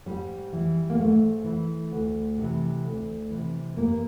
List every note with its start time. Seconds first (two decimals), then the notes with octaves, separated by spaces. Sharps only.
0.06 G#2 G3
0.53 E3
0.90 A#3
0.99 G#2 A3
1.44 E3
1.91 D2
2.38 C3 E3
2.84 D2
3.30 C3 E3
3.77 G2 A#3